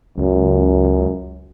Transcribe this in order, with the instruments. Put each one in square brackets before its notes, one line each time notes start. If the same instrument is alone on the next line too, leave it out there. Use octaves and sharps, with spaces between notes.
[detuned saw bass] C#2 [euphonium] F#2